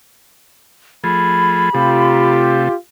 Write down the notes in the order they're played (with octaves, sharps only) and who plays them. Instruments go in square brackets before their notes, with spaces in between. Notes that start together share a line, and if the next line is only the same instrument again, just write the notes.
[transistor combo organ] F3 A3 G#4 [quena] B5
[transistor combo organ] C3 A3 [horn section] F4 G4